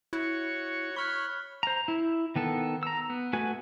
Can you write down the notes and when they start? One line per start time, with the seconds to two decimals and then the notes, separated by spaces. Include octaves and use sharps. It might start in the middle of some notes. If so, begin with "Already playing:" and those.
0.13 E4 F#4 C#5
0.96 C#5 B5 C#6 F6 F#6
1.63 C5 A#5
1.88 E4
2.36 D#3 B3 A4
2.83 A#5 E6
3.10 B3
3.33 A3 F#4 B4 G#5